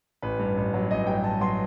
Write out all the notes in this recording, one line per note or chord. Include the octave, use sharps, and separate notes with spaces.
A1 B4
G2
A1
F#3
A1 D#5
G2 G5
A1 A5
F#3 C6